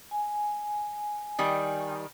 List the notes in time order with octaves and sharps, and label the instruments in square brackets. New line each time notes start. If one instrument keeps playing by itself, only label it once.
[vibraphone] G#5
[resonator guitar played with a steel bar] D#3 G3